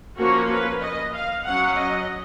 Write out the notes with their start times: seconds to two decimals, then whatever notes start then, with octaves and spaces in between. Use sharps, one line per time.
0.18 F3 A#3 C#4 F#4
0.50 B4
0.82 D#5
1.14 F5
1.46 F#3 C#4 F#5
1.78 D#5